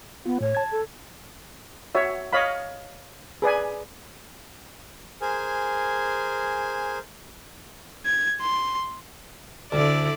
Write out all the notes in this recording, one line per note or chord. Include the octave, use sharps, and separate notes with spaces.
B3 F4
A2 C#5
A5 G#6
A4
F#4 C#5 E5
C#5 D#5 F5 B5
G#4 B4 D5 G#5
G#4 A#4 C5 G#5
G#6
C6
D2 D3 E4 D5